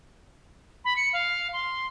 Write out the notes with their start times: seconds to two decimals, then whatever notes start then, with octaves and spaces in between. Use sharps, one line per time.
0.85 B5
0.97 C#7
1.13 F5
1.53 C6